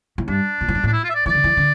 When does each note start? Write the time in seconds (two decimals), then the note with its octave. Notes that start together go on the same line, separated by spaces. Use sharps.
0.18 A2
0.27 G2 D4
0.61 A#2
0.68 A2
0.75 G2
0.84 A2 D4
0.92 E4
1.04 F4
1.10 E5
1.14 D5
1.26 E3 D5
1.35 D3
1.44 E3
1.57 D3